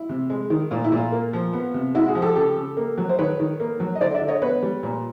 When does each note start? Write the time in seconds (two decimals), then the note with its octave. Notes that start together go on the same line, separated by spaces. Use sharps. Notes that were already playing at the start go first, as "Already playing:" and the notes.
Already playing: E4
0.09 C3
0.30 G#3
0.50 D#3
0.71 A#2 F4
0.84 E4
0.92 A#2
0.97 F4
1.12 A#3
1.33 F3
1.53 B3
1.74 C3
1.95 G#3 E4 F#4
2.08 F#4 G#4
2.15 F3
2.22 G4 A4
2.36 C#3 G4 A4
2.56 C#3
2.77 A#3
2.98 F#3
3.09 C5
3.19 D#3 B4 C#5
3.40 D#3
3.60 A#3
3.80 F#3
3.95 D#5
4.01 D3 C5 D5
4.14 D5 E5
4.22 D3
4.28 C#5 D#5
4.42 B3 B4 C#5
4.63 G3
4.83 A#2